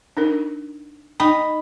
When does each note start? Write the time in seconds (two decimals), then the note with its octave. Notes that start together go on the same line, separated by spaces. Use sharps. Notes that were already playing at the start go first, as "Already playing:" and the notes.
0.17 D4 D#4 A#4
1.20 D#4 G5 B5